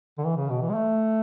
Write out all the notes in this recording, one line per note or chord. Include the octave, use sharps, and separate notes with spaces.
D3
E3
C#3
B2
E3
G#3
A3